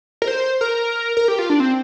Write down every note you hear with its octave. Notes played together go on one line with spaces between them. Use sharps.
A#4
C5
A#4
A#4
G4
F4
D4
C4